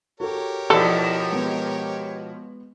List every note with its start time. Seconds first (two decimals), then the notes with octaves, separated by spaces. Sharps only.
0.20 F#4 G4 A4 A#4 C#5
0.70 B2 F3 E4 F4 A4 D5
1.32 G#3 B3